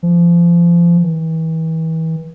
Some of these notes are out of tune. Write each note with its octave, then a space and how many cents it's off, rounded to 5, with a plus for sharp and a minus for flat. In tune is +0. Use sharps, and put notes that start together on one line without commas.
F3 -30
E3 -35